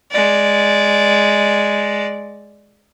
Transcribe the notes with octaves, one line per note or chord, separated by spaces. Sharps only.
G#3 D5